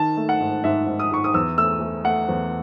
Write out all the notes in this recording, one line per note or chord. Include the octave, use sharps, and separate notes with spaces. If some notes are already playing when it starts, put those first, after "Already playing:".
Already playing: D#3 A5
A3
F#5
G#2
G#2 E5
G#2
D#6
G#2 C#6
D#6
E2 E6
A3 E6
A3
A3 F#5
E2